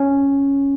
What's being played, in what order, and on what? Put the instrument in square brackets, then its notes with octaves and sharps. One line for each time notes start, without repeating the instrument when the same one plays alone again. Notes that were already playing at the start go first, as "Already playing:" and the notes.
Already playing: [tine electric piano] C#4